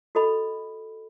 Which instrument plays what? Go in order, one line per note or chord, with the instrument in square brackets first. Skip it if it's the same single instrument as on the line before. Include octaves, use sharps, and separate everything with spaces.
[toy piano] F#4 A4 D#5 B5